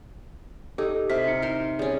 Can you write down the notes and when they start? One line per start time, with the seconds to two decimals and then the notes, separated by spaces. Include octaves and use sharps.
0.78 D#4 G4 A4
1.10 C3 F6 B6
1.27 D#4 C#7
1.42 A#4 C5 C6
1.79 G3 C#4 G#4